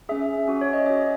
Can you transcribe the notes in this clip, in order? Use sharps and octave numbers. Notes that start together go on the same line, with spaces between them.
C#4 G#4 E5
C#4 F#4
C#5
D#5
C#4 F#4 E5